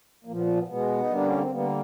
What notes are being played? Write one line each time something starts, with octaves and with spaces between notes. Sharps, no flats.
A#2 F3 A#3
B3
B3
B3
B2 G#3 B3
D#4
D3 G3 A#3 D4
C#4
C4
D3 G3 A#3 B3